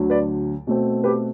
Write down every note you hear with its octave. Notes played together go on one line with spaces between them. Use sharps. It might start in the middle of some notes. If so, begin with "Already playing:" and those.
Already playing: D2 D3 F#3
B4 D5
B2 A3 C4
G4 B4